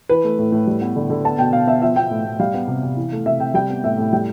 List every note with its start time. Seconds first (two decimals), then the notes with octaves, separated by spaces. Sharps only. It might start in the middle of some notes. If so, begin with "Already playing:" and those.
0.09 E3 B4
0.24 A3
0.39 A2
0.52 A2
0.67 G3
0.81 B3
0.96 D3
1.10 D3
1.25 B3 A5
1.39 B2 G5
1.53 B2 F5
1.67 B3 E5
1.82 F3 E5
1.96 B3 G5
2.11 A2
2.26 A2
2.39 G3 F5
2.54 B3
2.68 C3
2.83 C3
2.97 E3
3.12 A3
3.25 C3 E5
3.40 C3 G5
3.54 G3 G5
3.70 B3
3.83 A2 E5
3.98 A2
4.13 G3 G5